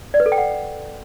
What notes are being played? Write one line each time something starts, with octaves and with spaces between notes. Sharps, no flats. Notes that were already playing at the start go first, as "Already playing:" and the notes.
D5
B4
A4
G5
F#5